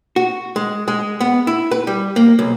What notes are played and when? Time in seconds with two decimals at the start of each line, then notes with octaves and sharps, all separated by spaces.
0.16 F#4
0.56 G#3
0.88 G#3
1.21 B3
1.47 E4
1.71 B4
1.87 G3
2.16 A#3
2.39 B1